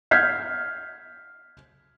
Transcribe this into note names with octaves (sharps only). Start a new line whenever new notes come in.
F6 G6 G#6 B6 C7